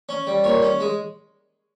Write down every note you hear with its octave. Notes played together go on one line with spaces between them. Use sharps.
C#4
G3
A#2 C#5
C#4
G#3